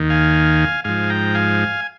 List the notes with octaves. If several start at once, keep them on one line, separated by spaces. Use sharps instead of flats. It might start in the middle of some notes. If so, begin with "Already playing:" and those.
Already playing: D#2 D#3
F5 G#5
G#2 F3 F5 G#5
G5 A#5
F5 G#5